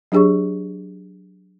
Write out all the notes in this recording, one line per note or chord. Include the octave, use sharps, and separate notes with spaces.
F#3 D4 G4 G#4 C#5 C#6